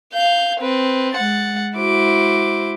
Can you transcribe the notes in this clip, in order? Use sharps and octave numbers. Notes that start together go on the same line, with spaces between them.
F5 G6
C4 B4
G#3 F#5 A6
G#3 E4 F#4 C5 D6